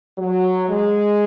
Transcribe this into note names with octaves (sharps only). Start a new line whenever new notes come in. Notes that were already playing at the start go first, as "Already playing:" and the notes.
F#3
G#3